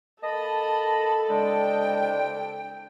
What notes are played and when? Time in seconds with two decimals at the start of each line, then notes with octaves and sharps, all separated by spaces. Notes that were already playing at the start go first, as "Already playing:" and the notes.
0.23 A#3 A4 D#5 A5 B5
1.30 C2 C#3 G#3 D4 G5